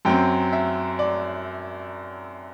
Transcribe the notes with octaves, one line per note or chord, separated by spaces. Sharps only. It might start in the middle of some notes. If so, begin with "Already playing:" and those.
F#2 F#3 C4 G5
E5
D5